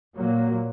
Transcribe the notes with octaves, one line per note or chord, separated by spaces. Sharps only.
A#2 F#3 A#3